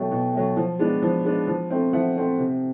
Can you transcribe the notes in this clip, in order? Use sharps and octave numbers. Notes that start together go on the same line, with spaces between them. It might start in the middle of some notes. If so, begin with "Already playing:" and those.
Already playing: B2 F#3 A3 G5
B2
F#3 A3
F3
G#3 B3 D4
F3
G#3 B3 D4
F3
A3 C4
F3 E5 F#5
A3 C4
C3